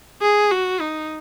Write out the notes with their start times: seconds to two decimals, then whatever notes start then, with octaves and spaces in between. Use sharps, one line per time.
0.21 G#4
0.51 F#4
0.80 D#4